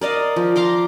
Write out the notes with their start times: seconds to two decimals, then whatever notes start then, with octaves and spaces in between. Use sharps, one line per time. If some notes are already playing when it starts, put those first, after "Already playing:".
0.01 A#4 D5 D#5 F5
0.36 F3
0.56 F5 A#5 C6 D6